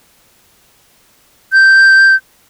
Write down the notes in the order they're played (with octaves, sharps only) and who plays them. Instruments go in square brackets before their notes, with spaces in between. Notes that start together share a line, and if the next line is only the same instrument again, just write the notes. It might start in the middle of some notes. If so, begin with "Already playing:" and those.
[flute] G6